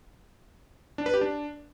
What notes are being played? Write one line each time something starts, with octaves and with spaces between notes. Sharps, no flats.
D4
B4
G4
D4